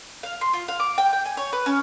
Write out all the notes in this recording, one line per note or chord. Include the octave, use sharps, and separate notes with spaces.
F5
C6
F4
F5
D6
G5
G5
G#5
C#5
B4
C#4